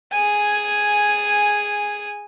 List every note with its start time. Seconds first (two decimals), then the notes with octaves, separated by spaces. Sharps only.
0.13 G#4 G#5